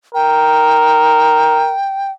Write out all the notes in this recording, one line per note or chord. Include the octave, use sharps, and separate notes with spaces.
A#4 G5